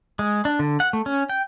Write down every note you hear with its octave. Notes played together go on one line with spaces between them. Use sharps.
G#3
D4
D3
F#5
A3
C#4
G5